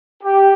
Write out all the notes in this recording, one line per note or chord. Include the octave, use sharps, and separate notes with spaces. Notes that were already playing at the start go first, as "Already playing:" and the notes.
G4